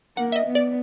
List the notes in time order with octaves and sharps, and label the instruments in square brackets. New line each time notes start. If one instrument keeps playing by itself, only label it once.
[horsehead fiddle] A#3 [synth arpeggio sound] F#5
[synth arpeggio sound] E5
D#5
[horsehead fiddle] B3
[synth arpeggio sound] D5